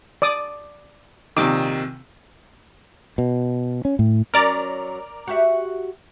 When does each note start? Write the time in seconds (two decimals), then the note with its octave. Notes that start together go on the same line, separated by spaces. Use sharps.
0.22 D5 D6 D#6
1.37 A#1 C3 D#3 D6
3.18 B2
3.85 C#4
3.99 A2
4.34 F#3 C#4 A#4 D5 A#5
5.27 F#4 G4 E5